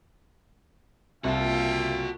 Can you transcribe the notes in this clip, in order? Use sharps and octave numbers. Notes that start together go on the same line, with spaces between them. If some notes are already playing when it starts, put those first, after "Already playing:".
C2 A#2 F4 F#4 A4 E5 G5 A5